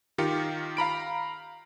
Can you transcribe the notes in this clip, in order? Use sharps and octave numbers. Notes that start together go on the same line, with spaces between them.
D#3 F4 G4 A#4 C#7
F5 A#5 B5 D7